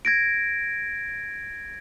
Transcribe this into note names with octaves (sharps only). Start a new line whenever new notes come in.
G#6 A#6 D7